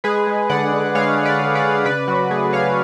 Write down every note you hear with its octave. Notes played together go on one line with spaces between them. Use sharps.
G#3 G#4 B4
G#3
D3 D5 F#5
D3
G#3 C#5 F5
G#3
B4 D5
D3
B4 D5
D3
C#3 B4 D5
F#3 F#4
A3 G#4
C#3 C#5 F5